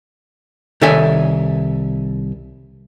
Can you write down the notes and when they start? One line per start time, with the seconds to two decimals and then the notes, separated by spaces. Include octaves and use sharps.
0.81 C2 D#3 A4 C#5 E5 G#5